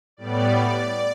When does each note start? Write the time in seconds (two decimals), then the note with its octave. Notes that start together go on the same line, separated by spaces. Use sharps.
0.17 A2 G3 B3 D5